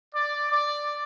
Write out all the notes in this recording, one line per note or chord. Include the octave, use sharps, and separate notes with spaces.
D5
D5